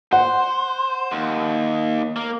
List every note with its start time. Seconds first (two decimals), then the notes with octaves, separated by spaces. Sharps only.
0.13 C5 F#5
1.12 D#2
2.16 A#3